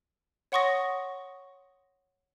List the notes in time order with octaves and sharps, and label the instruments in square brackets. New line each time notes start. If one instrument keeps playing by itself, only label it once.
[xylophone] C#5 F#5 C6 C#6 D#6 A#6